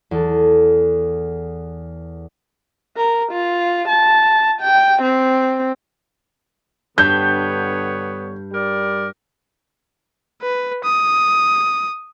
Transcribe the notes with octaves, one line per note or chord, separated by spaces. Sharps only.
E2 A4
A#4
F4
A5
G5
C4
G2 D3 B3 C#5 G6
G3 A#4 D5
B4
D#6